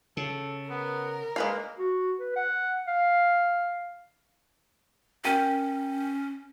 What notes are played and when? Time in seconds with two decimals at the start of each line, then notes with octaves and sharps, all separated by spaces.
0.17 C#3 A4
0.70 B3 A#4
1.36 G#3 A#3 B4 F5
1.79 F#4
2.19 B4
2.36 F#5
2.88 F5
5.24 C#4 A#4 G5